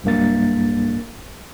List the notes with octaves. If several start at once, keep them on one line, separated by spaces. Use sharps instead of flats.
B1 G2 A#3 A6